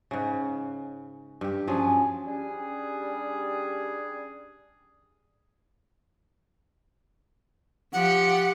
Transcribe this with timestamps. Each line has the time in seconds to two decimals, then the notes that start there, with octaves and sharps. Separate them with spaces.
0.11 G#2 C#3
1.41 G2 G4
1.67 F3 F#3 C#4 G#4 G#5
2.26 G3 C#4 D4 G#4
7.93 F3 G4 F#5